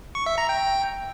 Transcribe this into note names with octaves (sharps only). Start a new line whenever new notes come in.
C#6
E5
A#5
G5